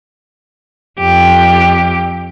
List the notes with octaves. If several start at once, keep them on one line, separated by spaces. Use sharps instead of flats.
F2 G4